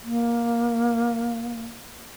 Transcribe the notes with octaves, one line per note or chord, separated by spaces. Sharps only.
A#3